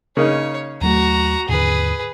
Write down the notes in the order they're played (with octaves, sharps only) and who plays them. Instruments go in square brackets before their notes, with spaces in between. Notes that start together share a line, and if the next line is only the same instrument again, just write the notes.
[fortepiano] C#3 A#3 D#4 [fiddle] C#5
[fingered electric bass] D#2 F#3 A3 [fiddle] F#4 A#5
[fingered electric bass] D#2 G#2 D3 [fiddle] G#4 B4